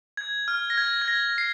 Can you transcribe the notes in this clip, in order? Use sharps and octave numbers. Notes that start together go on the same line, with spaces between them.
G#6
F6
A#6
G#6
G#6
A#6
C7